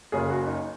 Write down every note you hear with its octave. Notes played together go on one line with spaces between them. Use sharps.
F#1 F#2 C#3 G#4
F#4
D#4